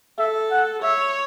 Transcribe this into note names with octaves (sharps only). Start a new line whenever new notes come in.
A4 E5
F#5
C#5 E5